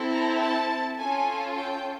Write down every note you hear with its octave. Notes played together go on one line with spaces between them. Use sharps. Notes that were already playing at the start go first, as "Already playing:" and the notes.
Already playing: C4 E4 A4
A#5
A5
C#4 F4 A4 G#5
G5